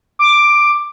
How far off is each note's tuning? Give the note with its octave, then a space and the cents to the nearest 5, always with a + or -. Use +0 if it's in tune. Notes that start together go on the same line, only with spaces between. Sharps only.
D6 +10